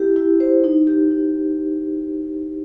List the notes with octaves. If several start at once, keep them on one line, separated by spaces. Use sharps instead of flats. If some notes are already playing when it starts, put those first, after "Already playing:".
Already playing: E4 G4
E4
C5
D#4
G4
D#4